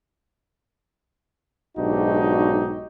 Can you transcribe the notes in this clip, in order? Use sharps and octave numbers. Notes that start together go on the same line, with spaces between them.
B1 G#2 D4 D#4 F#4 G4